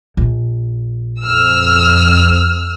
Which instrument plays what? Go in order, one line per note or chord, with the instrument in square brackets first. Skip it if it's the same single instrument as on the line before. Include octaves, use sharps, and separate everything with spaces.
[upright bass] A#1
[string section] F2 E6 F6